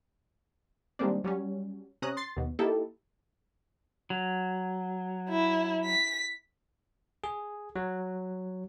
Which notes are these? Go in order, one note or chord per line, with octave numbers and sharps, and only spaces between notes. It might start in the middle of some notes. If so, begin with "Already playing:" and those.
D#3 G3 G#3 A#3 C4 D4
F#3 G3 C#4
C3 C#4 A#5 D#6 F#6
C6 A6 C7
D#2 B2
A#3 D#4 E4 G4 A4
F#3
E4
B6
G#4
F#3